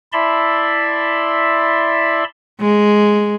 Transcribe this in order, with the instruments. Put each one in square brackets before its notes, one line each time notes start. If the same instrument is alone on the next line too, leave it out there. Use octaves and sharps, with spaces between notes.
[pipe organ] E4 D5 E5 A5 B5 C6
[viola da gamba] G#3